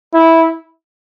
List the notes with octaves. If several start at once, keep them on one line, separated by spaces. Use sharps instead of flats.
E4